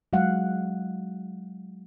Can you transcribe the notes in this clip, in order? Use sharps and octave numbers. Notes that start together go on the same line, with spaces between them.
F#3 G#3 F5 F#5